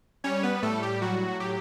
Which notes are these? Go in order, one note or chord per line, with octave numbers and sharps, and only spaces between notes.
G3 C#4 C#5
B3 B4
A2 A3 A4
G4
F#3 F#4
F#3 G4